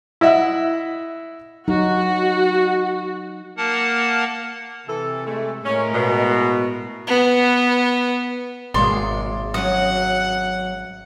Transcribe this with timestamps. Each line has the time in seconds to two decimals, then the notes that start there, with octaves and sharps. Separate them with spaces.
0.21 E4 D#5 E5 F#5
1.68 F#3 D#4 F#4
3.57 A#3 A#4 F#5 A5
4.89 C3 E3 A4
5.27 G#3 A3
5.66 A2 G#3 C#4 A#4
5.94 B2
7.07 B3
8.74 G#1 B2 G#3 A#3 C#5 D5 C6
9.54 F#3 C#4 F#4 F#5 D#6